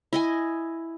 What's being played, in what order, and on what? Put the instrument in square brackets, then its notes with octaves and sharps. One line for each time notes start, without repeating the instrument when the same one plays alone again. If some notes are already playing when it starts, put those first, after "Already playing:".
[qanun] E4 D#5 G#5